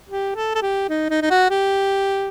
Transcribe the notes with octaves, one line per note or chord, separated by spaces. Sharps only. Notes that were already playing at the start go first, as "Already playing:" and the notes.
G4
A4
A4
G4
D#4
D#4
D#4
F#4
G4